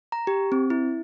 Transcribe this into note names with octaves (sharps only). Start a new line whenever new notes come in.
A#5
G4
C4
E4